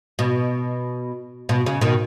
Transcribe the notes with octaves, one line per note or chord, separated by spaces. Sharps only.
B2
B2
C#3
B2 D#3